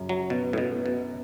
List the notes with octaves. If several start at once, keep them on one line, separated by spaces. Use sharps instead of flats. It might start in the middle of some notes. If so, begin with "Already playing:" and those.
Already playing: F#2 C#3
F#3
B2 B3
A2
B2
B3
B2